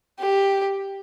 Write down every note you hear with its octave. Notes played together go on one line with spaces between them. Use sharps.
G4